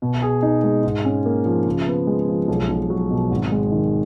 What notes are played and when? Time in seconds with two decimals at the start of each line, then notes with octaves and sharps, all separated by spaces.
0.02 B2
0.22 G#4
0.43 D#4
0.64 G#3
0.83 G#2
1.05 C#4
1.26 A#3
1.46 F3
1.65 C#3
1.87 B3
2.07 G#3
2.28 F3
2.48 B1
2.69 B1
2.90 F#3
3.11 B2
3.31 G#1
3.52 G#3
3.72 D#3